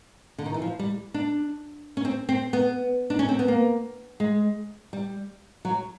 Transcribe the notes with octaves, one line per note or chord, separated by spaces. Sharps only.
D3
D#3
E3
F3
G3
D4
C#4
C4
C4
B3
D4
C#4
C4
B3
A#3
G#3
G3
F#3